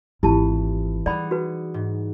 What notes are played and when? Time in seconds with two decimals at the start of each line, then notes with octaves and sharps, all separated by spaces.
0.23 G#1 E3 E4 F4 G4 A5
1.06 G3 D#4 G#4 D5 F#5 B5
1.31 F#4 B4
1.74 G#2